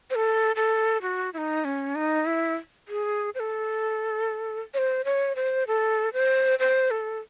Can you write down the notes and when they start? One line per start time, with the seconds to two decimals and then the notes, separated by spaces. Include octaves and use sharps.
0.10 C5
0.15 A4
0.56 A4
1.02 F#4
1.34 E4
1.38 D#4
1.65 C#4
1.95 D#4
2.26 E4
2.88 G#4
3.35 C5
3.40 A4
4.74 C#5
4.78 C5
5.05 C#5
5.36 C5
5.68 A4
6.13 C5
6.60 C5
6.91 A4